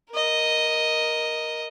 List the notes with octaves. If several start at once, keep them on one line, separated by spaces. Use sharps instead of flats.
A#4 D#5